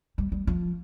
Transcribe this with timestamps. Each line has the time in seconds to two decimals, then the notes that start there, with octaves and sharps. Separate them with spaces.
0.18 G3
0.32 G3
0.47 F3